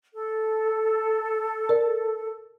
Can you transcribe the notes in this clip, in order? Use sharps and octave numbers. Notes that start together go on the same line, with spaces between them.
A4
A#4 D5